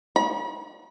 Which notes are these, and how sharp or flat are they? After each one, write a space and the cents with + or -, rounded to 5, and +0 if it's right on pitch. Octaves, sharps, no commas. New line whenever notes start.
B5 -45